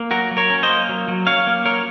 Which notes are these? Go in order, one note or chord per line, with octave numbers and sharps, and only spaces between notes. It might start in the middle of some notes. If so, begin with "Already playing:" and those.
Already playing: A#3
F#3 F#4 A#4
F#3
A#4 C#5
C#4
C5 D#5
A#3
F#3
F#3
C#4 C#5 F5
A#3
F#3 A#4 C#5